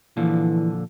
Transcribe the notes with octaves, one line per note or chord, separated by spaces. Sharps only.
A#2 D3 E3 F3